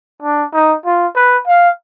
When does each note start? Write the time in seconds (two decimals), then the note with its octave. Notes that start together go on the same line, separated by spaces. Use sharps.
0.22 D4
0.53 D#4
0.85 F4
1.16 B4
1.47 F5